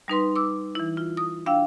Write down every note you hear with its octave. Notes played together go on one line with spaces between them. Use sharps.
G3 D#4 B4 C6
D6 E6
E3 E4
F4
D#6
D4 F5 G5 E6